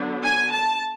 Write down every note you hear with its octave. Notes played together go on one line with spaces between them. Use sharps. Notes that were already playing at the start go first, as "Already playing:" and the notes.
Already playing: D3 F#3 B3 D4
G#5
A5